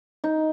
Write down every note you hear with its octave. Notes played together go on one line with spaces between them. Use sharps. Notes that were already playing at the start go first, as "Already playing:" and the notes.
D#4